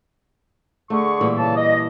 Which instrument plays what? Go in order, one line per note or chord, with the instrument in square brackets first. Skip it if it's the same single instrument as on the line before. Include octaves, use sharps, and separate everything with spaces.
[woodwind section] D3 G#4 C#6 [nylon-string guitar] A3
[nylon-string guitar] A#2 E3 G3
[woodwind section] C#3 A5
D#5